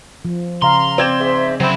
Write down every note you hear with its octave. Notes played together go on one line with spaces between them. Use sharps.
F3
C#3 F5 A#5 C6
C4 D5 G#6 E7
G#2 E5
C#3 F#3 C4 E4